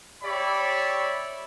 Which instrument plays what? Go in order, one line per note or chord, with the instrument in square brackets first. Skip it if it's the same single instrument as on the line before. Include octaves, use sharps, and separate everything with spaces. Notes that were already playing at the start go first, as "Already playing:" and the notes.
[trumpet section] G4 C#5 D5 E5 B5